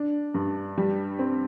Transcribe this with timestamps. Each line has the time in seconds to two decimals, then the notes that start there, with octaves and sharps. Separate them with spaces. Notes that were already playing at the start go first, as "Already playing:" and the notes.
Already playing: D4
0.34 G2
0.78 G3
1.19 C4